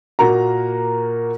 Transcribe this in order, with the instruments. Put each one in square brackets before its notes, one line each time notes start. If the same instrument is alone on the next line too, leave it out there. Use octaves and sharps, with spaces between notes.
[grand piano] A#2 A#3 F#4 A#5